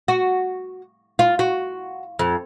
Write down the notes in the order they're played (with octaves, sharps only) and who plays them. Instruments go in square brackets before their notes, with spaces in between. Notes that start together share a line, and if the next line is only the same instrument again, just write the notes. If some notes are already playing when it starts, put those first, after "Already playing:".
[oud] F#4
F4
F#4
F2